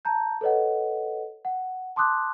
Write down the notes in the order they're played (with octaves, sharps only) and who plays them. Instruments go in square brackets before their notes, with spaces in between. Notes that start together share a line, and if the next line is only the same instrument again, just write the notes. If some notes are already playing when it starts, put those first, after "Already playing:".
[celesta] A5 A#5 G6
A4 B4 C#5 D#5 F#5
F#5
A5 C6 D6 D#6 F#6